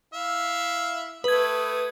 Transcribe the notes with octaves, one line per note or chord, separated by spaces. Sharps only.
E4 E5 F5
A3 B4 D#6 G#6